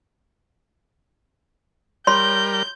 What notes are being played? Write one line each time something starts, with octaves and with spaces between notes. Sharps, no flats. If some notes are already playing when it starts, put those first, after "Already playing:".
G3 A#4 C#5 B5 C6 G6